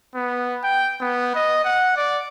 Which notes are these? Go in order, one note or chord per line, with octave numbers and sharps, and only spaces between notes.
B3
G5
B3
D#5
F#5
D5